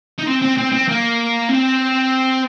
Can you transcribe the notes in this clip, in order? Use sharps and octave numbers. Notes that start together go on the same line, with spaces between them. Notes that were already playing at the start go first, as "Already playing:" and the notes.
D#4
C4
C4
C4
C4
A#3
C4